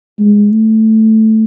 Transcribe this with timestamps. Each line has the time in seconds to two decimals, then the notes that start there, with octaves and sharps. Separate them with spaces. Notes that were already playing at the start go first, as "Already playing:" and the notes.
0.19 G#3
0.52 A3